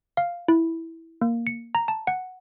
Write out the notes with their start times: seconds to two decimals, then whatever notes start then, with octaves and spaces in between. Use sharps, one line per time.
0.17 F5
0.48 E4
1.22 A#3
1.47 C#7
1.75 A#5
1.88 A5
2.07 F#5